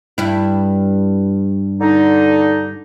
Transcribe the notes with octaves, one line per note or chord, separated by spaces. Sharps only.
G2 E4
D3 D#4